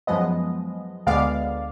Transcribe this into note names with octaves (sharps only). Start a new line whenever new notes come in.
F#2 F3 G#3 B3 D#5
D2 D3 G#3 B3 D5 F5